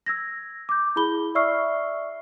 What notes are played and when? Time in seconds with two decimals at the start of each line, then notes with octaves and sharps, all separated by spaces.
0.06 E6 G#6 A#6
0.69 D6 G6
0.96 E4 G#4 B5 G7
1.35 D5 E5 C#6 E6 F6 C7